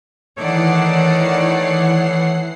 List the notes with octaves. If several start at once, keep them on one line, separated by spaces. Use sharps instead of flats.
D#3 E3 A3 D#4 C#5 D5 F#5 C7